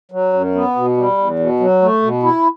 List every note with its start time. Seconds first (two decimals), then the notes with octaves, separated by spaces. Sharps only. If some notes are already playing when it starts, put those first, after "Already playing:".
0.12 F#3
0.33 F#2
0.55 B3
0.76 B2
0.97 G3
1.18 E2
1.39 B2
1.60 F#3
1.82 A3
2.02 B2
2.23 E4